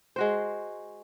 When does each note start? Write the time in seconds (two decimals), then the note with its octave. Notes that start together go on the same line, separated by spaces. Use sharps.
0.16 G#3 F#4 C5